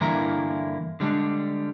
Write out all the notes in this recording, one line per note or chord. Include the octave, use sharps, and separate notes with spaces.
G2 D3 E3 A#3 E4 A#5
D3 G3 G#3 D4